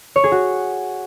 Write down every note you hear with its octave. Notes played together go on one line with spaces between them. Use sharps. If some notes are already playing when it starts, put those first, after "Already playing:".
C#5
G#4
F#4